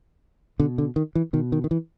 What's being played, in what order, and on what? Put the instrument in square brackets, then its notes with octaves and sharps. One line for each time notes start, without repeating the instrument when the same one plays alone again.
[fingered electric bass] B2 D3
D3
D#3
E3
B2 D#3
D#3
D#3
E3